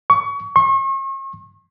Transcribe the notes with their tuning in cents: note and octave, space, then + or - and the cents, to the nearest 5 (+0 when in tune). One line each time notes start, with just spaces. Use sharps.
C#6 +30
C#6 -40